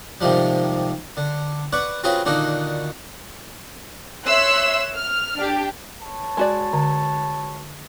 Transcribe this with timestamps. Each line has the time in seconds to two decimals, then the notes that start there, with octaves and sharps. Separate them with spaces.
0.21 G#2 C3 D#3 F3 G3
1.17 D3
1.73 B4 D5 F#5 C#6
2.04 C4 C#4 F4 F#4 G#4 B4
2.25 A#2 D3 D#3 D4 D#4 F#4
4.25 C#5 E5 C6 E6 F#6
4.94 F6
5.36 D4 G4
6.02 B4 C#5 A5
6.37 G#3 F#4 D5
6.73 D3